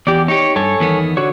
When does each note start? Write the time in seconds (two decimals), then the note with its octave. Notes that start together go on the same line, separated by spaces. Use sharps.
0.07 E2 G4 D5
0.28 D#4 G4 C#5
0.56 G2 A4 C#5 G#5
0.80 E2 D#3 B3
1.17 D3 F#4 C#5